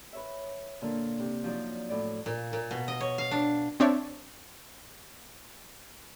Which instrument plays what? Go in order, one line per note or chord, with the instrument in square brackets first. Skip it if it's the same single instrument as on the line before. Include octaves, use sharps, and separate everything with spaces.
[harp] B4 C#5 E5
A#2 D3 A#3
C3
F3 F#3 D#4 D5
A2 D5
[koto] A#2
A#2
B2
D#5
C#5
F5
D4
[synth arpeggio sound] C4 D4 C#5 E5